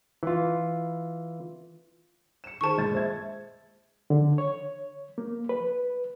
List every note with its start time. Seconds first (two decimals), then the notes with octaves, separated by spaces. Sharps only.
0.23 E3 F4
2.44 C#7 E7
2.61 D#3 G#4 C5 A5 C#6
2.78 A#1 G#3 A6
2.93 C5 E5 G#6
4.10 D3
4.38 C#5
5.18 A#3
5.49 B4